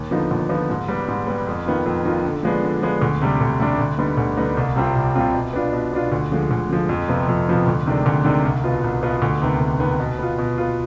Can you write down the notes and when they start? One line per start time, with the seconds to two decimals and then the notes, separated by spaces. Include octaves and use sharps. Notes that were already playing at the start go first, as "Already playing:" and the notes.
Already playing: D#2
0.11 D3 F3 B3 D#4
0.31 D#2
0.49 D3 F3 B3 D#4
0.70 G#2
0.88 G3 B3
1.08 G#2
1.27 G3 B3
1.47 F2
1.66 D#3 B3 F4
1.86 F2
2.05 D#3 B3 F4
2.25 D3
2.43 F3 G#3 B3 D4
2.63 D3
2.82 F3 G#3 B3 D4
3.02 D2
3.22 C3 G3 D4
3.41 D2
3.59 C3 G3 D4
3.79 D2
3.98 D3 G3 B3 D#4
4.17 D2
4.37 D3 G3 B3 D#4
4.57 C2
4.76 C3 G3 C4 F4
4.95 C2
5.15 C3 G3 C4 F4
5.34 B2
5.53 B3 D4 F4
5.73 B2
5.93 B3 D4 F4
6.12 D2
6.31 D3 F3 G#3
6.51 D2
6.70 D3 F3 G#3
6.89 F2
7.08 C3 F3 B3
7.29 F2
7.48 C3 F3 B3
7.67 D2
7.86 C3 D#3 G#3 D4
8.06 D2
8.25 C3 D#3 G#3 D4
8.45 C2
8.64 B2 B3 F4
8.84 C2
9.03 B2 B3 F4
9.22 D2
9.42 C3 D#3 B3
9.60 D2
9.80 C3 D#3 B3
10.00 B2
10.19 B3 F4
10.38 B2
10.58 B3 F4